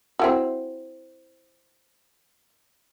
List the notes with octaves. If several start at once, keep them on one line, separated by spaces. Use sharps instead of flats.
C4 E4 F#4